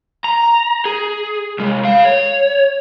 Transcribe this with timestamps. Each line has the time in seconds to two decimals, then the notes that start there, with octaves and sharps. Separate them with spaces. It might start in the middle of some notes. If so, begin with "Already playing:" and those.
0.24 A#5
0.85 G#4
1.59 C2 G#3
1.85 G#4 F5
2.05 C#5